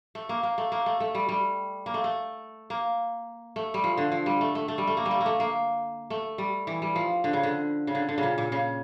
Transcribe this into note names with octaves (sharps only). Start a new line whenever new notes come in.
A3
A#3
A#3
A3
A#3
A3
A3
G3
G3
A#3
A3
A3
A#3
A3
G3
F3
D3
F3
G3
A3
A3
A3
G3
A3
A#3
G3
A3
A#3
A3
A#3
A3
G3
E3
G3
F3
D3
C#3
D3
C#3
D3
D3
C#3
A#2
A#2
C#3